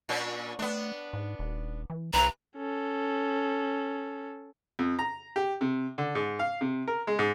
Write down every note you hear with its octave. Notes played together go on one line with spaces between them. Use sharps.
A#2 C#4 D4
A3 B3 D4
G#2
D#1
E3
C2 C3 E3 B4 A#5
C#4 A4
F2
A#5
G4
C3
D3
G#2
F5
C3
A#4
G#3
G#2